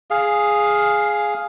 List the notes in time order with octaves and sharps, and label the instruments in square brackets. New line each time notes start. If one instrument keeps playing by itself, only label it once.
[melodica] G#4 F5